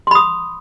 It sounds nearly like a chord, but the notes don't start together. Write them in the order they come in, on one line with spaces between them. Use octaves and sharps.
C6 B5 D#6